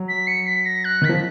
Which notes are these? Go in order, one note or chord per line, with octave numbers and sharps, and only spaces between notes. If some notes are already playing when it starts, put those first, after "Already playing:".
Already playing: F#3
B6
C#7
B6
A#6
F#6
D#3
F3 B6